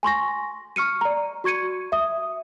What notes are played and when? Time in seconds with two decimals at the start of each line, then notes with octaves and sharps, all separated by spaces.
0.03 G#5 C6 C#6 A#6
0.76 C#6 F6 C#7 D#7
1.01 D5 A#5
1.44 F#4 C#6 G#6 C#7 D#7
1.92 E5 D#6